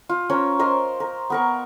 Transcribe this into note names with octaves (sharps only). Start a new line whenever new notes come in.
F4
C#4 A#4 C5 C#5
A#4 C5 D#5 C6
A#4
B3 A#4 C#6